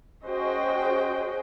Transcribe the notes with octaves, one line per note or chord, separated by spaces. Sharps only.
C#4 F#4 G#4 C5 D#5 G5